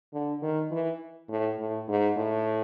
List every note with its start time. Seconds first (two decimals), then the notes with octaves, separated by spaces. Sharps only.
0.13 D3
0.42 D#3
0.71 E3
1.30 A2
1.59 A2
1.88 G#2
2.17 A2